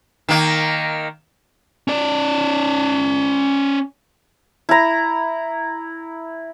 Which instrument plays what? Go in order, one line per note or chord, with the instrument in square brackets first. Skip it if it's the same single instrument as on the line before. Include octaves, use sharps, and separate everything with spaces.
[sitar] D#3 A#3
[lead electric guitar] C#4 D5
[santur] E4 A#5